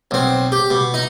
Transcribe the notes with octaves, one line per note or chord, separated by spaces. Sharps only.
B1 C4
G4
B2
D#4